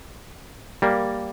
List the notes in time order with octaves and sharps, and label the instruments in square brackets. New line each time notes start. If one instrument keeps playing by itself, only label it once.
[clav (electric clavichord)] G3 A#3